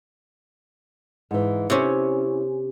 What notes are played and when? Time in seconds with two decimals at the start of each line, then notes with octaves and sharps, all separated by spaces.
1.31 G#2 E3
1.70 C3 C#4 E4 C#5